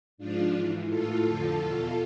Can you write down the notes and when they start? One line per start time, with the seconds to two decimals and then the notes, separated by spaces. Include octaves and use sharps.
0.18 G#2 F3 D4 F4
0.53 G#2 E3
0.87 A2 E3 F4 A4
1.22 F2 D3 F3
1.57 E2 B2